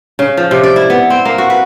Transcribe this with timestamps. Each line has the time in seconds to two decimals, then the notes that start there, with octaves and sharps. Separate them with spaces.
0.19 C#3
0.37 F3
0.51 C3
0.63 D5
0.76 E4
0.90 B3
1.10 C4
1.25 A#3
1.38 F#4
1.50 B4